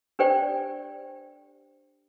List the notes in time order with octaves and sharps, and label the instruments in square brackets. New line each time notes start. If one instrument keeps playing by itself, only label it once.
[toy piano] D4 G4 A4 C5 D5 G5